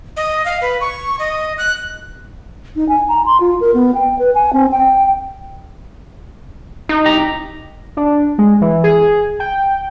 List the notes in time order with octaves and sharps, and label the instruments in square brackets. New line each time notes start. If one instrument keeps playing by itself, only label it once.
[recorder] D#5
F5
B4
C#6
D#5
F#6
[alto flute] D#4
G#5
A#5
C6
F4
A#4
B3
G5
B4
G#5
C4
G5
[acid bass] D#4
[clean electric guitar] C2 G4 A#5
[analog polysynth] D4
G#3
E3
G#4
G5